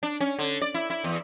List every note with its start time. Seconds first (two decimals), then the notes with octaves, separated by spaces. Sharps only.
0.03 D4
0.21 C#4
0.39 D3
0.62 D5
0.74 E4
0.90 E4
1.04 E2